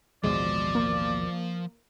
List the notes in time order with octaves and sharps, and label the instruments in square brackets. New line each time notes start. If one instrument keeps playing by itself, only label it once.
[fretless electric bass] A1 D#2 B2 [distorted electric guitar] F3 C5 [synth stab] G#3 [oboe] D5
[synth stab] A#3